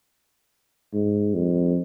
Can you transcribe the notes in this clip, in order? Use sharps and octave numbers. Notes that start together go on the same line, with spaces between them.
G#2
F2